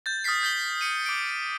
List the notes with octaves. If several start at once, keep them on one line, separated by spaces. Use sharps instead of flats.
G6 A6
D#6 F6 A6 B6 C7
G6 A6 B6 G7
C#7 D#7
D6 D7